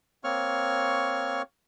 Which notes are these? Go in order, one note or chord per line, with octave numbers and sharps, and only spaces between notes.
A#3 C4 C#5 C#6 F6